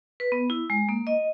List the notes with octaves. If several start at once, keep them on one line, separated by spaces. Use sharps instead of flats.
B4
B3
E4
G#3
A#3
D#5